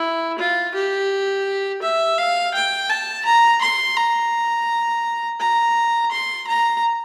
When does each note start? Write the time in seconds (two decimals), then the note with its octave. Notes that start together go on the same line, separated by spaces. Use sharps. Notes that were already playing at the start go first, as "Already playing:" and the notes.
Already playing: E4
0.39 F4
0.75 G4
1.82 E5
2.18 F5
2.54 G5
2.90 A5
3.25 A#5
3.62 C6
3.96 A#5
5.40 A#5
6.12 C6
6.48 A#5